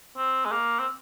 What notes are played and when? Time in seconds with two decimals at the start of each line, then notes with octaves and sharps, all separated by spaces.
0.17 C4
0.46 G#3
0.52 A#3
0.79 C4